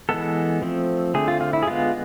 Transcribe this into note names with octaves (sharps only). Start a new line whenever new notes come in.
E3 G#3 B3 A4
F3 A3 C4
D3 A3 C4 G#4
F4
F4
E4
G#4
D3 G#3 B3 F4